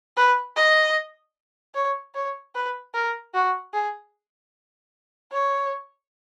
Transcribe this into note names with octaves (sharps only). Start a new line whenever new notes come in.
B4
D#5
C#5
C#5
B4
A#4
F#4
G#4
C#5